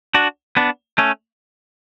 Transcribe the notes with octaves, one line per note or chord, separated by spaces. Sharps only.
D4 F#4
B3 D4
A3 C#4